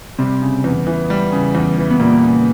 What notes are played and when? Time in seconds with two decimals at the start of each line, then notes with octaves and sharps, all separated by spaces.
0.19 C3 G3 C4
0.42 C#3
0.64 E2
0.87 E3
1.10 G3
1.32 C#3
1.55 E2
1.78 E3
1.91 B3
2.00 A#2 G3 A#3
2.23 C#3